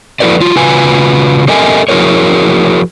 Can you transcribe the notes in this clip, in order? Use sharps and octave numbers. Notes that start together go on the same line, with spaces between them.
F3 E4 F#4 A4 B4 D5
F#3 F4
C#3 F4 F#4 B4 G#5
G4 A4 A#4 D#5 E5 G#5
F3 E4 F#4 G#4 A#4 C#5